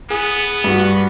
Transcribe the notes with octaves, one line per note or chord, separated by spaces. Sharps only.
B3 G#4
G2 F#4